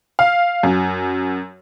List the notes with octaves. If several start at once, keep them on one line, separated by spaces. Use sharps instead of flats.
F5
F#2